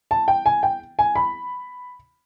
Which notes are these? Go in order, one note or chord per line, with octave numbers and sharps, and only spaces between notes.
A5
G5
G#5
G5
G#5
B5